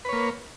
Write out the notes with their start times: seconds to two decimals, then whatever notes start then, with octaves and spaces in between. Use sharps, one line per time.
0.05 B4
0.09 C#5
0.13 A#3